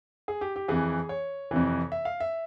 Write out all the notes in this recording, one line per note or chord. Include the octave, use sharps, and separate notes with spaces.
G#4
G4
G4
F2 E3 G#4
C#5
F2 C3 E3
E5
F5
E5